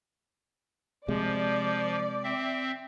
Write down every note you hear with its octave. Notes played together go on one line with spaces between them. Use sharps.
C3 F3 G#3 D5
C4 E5